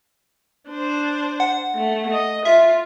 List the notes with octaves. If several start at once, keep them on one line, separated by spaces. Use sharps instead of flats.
D4 C5
F#5
A3
D#5
F4 E5